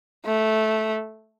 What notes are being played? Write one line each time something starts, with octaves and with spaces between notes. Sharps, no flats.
A3